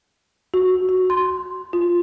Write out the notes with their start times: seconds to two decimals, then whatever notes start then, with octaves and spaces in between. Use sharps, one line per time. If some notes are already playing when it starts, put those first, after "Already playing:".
0.54 F#4
0.89 F#4
1.10 C6
1.73 F4